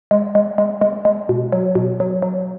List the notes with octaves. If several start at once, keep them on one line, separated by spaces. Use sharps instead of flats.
G#3
G#3
G#3
G#3
G#3
B2
F#3
B2
F#3
F#3